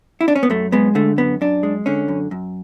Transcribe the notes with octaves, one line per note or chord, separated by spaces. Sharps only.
E4
D4
C#4
B3
F#2 A3
G#3 B3
D3 A3
F#2 B3
F#2 D4
G#3
D3 C#4
F#2
F#2